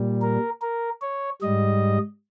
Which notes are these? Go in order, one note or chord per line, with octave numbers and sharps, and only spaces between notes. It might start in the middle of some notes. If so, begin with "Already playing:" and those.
Already playing: A#2 G3
A#4
A#4
C#5
G#2 G3 D#5